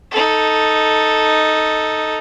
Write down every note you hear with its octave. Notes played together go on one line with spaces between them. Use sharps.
D#4 A4